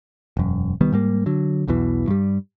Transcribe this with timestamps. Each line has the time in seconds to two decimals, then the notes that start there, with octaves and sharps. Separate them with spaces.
0.37 E1 F#2
0.81 C2 D#3 G3 B3
0.92 G#2 G3 A#3
1.26 D3 F#3
1.68 B1 E2 B2 E3
2.08 G2 G3